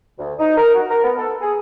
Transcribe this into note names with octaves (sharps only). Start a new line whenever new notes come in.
D2
D#4
A#4
F#4
A#4
B3
A4
G#4